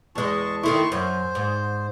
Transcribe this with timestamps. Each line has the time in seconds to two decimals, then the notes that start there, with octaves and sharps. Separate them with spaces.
0.15 E2 G#3 A5 C#6
0.63 D#3 A3 E4 C6 C#6
0.92 F#2 C5
1.35 G#2